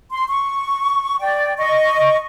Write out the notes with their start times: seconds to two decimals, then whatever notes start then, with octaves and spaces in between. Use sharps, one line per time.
0.11 C6
0.30 C#6
1.20 D5 G5
1.58 D#5 C#6